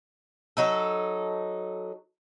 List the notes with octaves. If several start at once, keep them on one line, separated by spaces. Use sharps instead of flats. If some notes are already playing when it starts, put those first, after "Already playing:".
F#3 D#4 A4